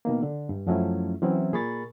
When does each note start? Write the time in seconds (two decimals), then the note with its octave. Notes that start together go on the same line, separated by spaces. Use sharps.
0.05 B2 D#3 A#3
0.23 D3
0.49 G2
0.67 F#2 F3 F#3 A3 C#4 E4
1.22 E3 F#3 C4 C#4 E4
1.53 A#2 G#4 A#4 B5 C#6 A6